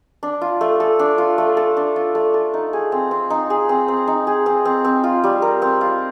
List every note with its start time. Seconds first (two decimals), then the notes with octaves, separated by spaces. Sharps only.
0.23 D4
0.41 F4
0.61 A3
0.80 A4
0.99 D4
1.18 F4
1.38 A3
1.57 A4
1.77 D4
1.96 F4
2.15 A3
2.34 A4
2.54 D#4
2.73 G#4
2.92 C4
3.11 C4
3.30 D#4
3.50 G#4
3.69 C4
3.88 C4
4.08 D#4
4.27 G#4
4.46 C4
4.65 C4
4.85 C4
5.04 F4
5.24 G3
5.42 A#4
5.62 C4
5.81 F4